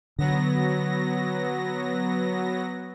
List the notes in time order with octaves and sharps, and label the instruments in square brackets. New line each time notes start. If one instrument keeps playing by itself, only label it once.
[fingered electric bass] D3 [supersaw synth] F#3 B3 A#6